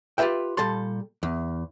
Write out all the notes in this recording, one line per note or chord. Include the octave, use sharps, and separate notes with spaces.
F4 G4 G#4 B4 E5 G5
A#2 G3 A4 A5 C6
E2